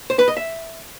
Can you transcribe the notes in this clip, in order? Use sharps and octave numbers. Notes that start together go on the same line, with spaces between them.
C5
B4
D#5
E5